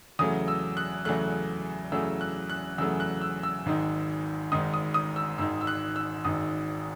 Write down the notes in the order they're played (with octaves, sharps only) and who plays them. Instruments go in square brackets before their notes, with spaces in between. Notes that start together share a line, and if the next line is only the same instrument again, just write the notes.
[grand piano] E2 C#3 F#3 A3 D#6
E6
F#6
E2 C#3 F#3 A3 F#6
E2 C#3 F#3 A3 E6
F#6
F#6
E2 C#3 F#3 A3 E6
F#6
E6
E6
G#1 G#2 D#3
G#1 G#2 D#3 D#6
D#6
D#6
E6
G#1 G#2 D#3 E6
E6
F#6
E6
G#1 G#2 D#3 D#6